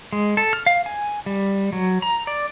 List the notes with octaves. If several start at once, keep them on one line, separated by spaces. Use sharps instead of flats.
G#3
A4
F6
F5
G#5
G3
F#3
A#5
D5